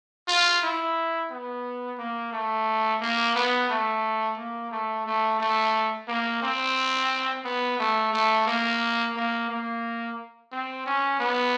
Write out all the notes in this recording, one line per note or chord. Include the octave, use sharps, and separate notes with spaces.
F4
E4
B3
A#3
A3
A#3
B3
A3
A#3
A3
A3
A3
A#3
C4
B3
A3
A3
A#3
A#3
A#3
C4
C#4
B3